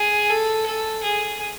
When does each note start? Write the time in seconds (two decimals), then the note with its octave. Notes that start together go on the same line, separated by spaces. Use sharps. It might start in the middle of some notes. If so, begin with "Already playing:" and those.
Already playing: G#4
0.30 A4
0.66 A4
1.03 G#4